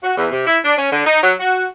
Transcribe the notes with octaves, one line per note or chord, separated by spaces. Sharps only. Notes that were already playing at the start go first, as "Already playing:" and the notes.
F#4
E2
C3
E4
D4
C#4
D3
D#4
F#3
F#4